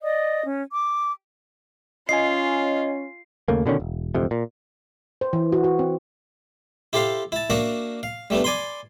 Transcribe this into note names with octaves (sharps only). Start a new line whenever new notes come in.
D5 D#5 D#6
C#4
D6
C#4 F4 D#5 G#5 C7
D#2 C#3 A3 A#3
B2 D3 D#3 C#4
E1
D1 F2 C3
A#2
C5
E3
F#4
F#4
C4
E4 G4 A4 C5 F5
E4 A5
A#3 D4 F#4 A#4 E5 F#5
F5
G3 A3 B3 D4
D5 G#5 B5 C6